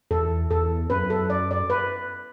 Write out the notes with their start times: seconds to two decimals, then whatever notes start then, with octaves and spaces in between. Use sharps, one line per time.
0.11 E2 A4
0.50 E2 A4
0.90 F#2 B4
1.10 A4
1.30 D5
1.51 D5
1.70 B4